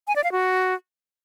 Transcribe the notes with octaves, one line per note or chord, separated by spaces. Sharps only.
G#5
D5
F5
F#4